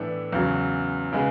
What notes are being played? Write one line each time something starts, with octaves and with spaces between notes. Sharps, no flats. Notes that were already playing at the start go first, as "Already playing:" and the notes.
Already playing: A2 E3 B3 D4 A4
E2 C#3 F#3
C#3 G#3 B3